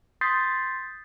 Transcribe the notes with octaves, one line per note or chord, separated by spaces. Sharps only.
C6 D#6 G6 A6 B6 C7